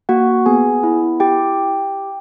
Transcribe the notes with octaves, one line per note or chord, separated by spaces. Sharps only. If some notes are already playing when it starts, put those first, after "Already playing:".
A#3 F#4 F#5
B3 G#4 G#5
E4
G4 G5